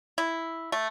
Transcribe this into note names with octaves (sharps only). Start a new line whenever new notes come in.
E4
A3